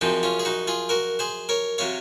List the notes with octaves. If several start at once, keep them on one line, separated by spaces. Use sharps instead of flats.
F#2 F3 G#3 C4 D#4
C#4 F4
G#4
D#4 F#4
F4 G#4
F#4 A#4
G#4 C5
A#4 C#5
C3 F#3 C#5 F5